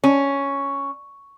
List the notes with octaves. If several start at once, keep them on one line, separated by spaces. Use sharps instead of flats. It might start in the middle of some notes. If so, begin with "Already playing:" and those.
C#4